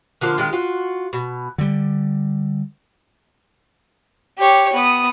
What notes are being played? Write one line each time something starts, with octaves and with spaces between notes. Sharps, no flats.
D3 F3 A#3
D#3 G#3 F4
F4 F#4
B2
D3 G3
G4 C#5
B3 D#6